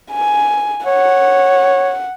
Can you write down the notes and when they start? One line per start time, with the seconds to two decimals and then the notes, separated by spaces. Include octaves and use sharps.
0.11 G#5
0.86 C#5 F#5